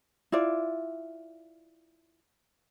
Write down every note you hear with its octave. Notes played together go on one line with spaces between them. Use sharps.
E4 F4 D5